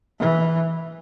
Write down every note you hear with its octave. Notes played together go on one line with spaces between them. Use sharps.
E3